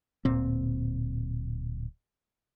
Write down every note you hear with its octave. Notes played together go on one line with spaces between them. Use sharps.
D1 A#2 C4